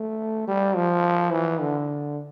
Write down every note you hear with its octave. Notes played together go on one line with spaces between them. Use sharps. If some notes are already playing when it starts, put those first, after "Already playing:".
Already playing: A3
G3
F3
E3
D3